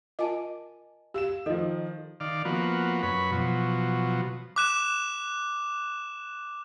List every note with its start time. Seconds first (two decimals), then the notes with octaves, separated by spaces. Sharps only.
0.19 F4 A#4 D#5 G#5 A5 D6
1.14 G4 F5 E6 E7
1.46 D#3 F3 A4 D#5
2.20 D#3 D5 F5
2.45 F3 A#3 B3 F#4
3.03 F#2 B4 C#5 B5
3.32 B2 F3 F#3
4.56 D6 F#6 E7